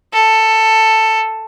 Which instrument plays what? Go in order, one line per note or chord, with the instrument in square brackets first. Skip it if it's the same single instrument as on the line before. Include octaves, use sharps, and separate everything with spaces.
[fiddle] A4